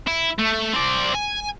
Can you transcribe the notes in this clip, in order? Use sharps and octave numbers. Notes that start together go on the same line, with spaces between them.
E4
A3
C4 D5
G#5